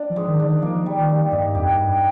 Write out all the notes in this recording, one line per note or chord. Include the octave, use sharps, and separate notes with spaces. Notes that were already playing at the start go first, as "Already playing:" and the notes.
Already playing: D4
F3
G#2
D#3
D4
D#3
F3 A#3
G3
D#3
G3
G2 D#4
F2 G4
G2
G4